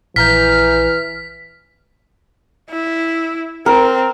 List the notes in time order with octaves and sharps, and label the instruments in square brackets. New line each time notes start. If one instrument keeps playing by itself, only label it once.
[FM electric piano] A#1 A#5 G6 [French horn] E3 [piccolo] F6 [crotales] B6
[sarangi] E4
[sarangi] C4 [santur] A#4